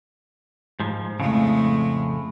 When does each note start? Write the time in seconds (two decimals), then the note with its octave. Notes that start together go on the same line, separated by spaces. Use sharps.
0.80 G#2 F3
1.19 F2 A2 C#3 G#3 A3